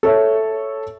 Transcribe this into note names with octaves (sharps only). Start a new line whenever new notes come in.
A4 C#5 E5